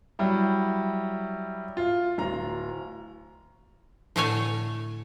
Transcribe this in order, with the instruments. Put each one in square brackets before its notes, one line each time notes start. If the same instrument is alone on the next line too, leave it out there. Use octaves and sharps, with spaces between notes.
[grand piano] F#3 G3 E4
F4
D1 A#5
[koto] A2 D3 A3 A4 C#5 G#5